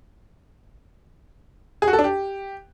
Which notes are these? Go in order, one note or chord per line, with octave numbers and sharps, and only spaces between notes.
G#4
F#4
A4
D4
G4